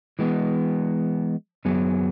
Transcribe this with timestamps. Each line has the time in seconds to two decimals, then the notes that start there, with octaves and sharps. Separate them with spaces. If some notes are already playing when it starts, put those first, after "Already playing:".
0.19 E3 G#3 B3
1.65 F#2 F#3 B3 G#4